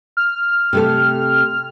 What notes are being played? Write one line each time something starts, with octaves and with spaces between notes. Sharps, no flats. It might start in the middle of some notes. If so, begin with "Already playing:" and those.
F6
C3 A3 A4